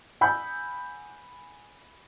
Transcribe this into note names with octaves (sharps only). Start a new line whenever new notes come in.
F#5 G#5 B5 E6 G6